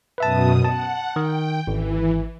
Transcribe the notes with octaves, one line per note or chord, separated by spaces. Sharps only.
F#2 B2 B4 E5 A5 D#6
F#5 A5
D#3 G5
G#1 E3